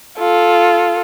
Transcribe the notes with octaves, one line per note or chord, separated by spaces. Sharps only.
F4 A4